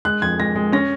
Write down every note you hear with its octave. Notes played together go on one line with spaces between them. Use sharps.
G#3 F#6
F2 G#6
G#3 A#6
G#3
C#4 A#6